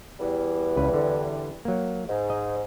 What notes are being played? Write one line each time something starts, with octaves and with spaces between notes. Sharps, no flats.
E2 E3 G3
C#2 B4
D3
F#3 A#3
G#2
D#5